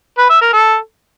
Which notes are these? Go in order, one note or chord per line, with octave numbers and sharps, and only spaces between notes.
B4
E5
A#4
A4